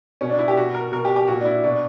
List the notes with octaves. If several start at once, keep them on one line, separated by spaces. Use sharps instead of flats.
B2 C#4
D4
E4
G4
B2 F#4
A#4
B2 A#4
G4
G4
A#2 F#4
D4
E4
B2 D4